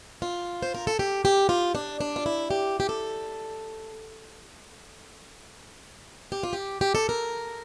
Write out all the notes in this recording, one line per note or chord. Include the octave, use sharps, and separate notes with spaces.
F4
C5
A#4
A4
G4
G4
F4
D4
D4
F4
E4
G4
G4
A4
G4
F4
G4
G4
A4
A#4